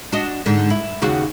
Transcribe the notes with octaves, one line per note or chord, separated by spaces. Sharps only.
D4 F#4 D#5
G#2 D3
E4
D#2 C#3 F#4